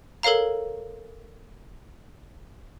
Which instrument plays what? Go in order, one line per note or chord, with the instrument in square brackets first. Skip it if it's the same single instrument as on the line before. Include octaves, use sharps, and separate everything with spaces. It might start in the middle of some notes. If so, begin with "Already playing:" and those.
[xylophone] A4 A#4 C#5 F5 A#5